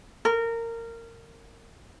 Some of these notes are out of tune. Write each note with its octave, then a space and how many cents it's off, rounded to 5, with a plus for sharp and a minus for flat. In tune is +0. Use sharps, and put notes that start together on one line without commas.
A#4 -20